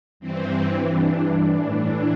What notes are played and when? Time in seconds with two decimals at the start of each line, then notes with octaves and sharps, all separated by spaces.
0.20 G2 E3 C4
0.80 D4
1.41 A2 E3 D4